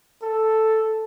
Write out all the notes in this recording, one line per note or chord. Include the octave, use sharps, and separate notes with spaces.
A4